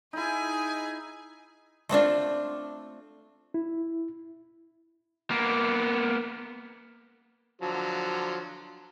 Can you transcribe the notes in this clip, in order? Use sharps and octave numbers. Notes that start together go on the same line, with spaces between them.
D#4 E4 G#4 G#5
A3 C4 D4 F4
E4
A#3 B3
D3 F3 F#3